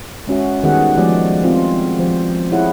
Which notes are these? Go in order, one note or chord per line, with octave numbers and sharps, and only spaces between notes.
G#3 C#4 F#4 E5
D#3 G3 B3 F#4 G#4 F#5
F3 G#3 A3 B3 G4 D5
C4 F4
F3 C5
E4 G4 G#4 C#5 F#5